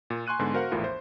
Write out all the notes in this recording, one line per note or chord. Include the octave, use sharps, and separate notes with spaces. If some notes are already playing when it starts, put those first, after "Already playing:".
A#2
G#5 C6 C#6 F#6 D#7
G#2 D3 B3 G#5 C6
F#4 A#4 C5 F5 F#5
A#1 E2 A2 F3 A#3 F4
C5